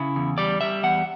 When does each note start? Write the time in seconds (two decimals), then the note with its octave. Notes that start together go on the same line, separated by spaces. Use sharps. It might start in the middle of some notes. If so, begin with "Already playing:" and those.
Already playing: C#3 E4
0.16 E2
0.38 G3 D5
0.61 G3 E5
0.83 E2 F#5